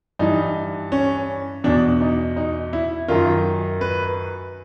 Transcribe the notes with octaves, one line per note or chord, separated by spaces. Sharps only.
G2 E3 D#4
C#4
E2 B2 D4
D#4
D#4
E4
F#2 D#3 F4
B4